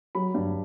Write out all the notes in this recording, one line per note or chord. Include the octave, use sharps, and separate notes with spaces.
F#3 B5
G2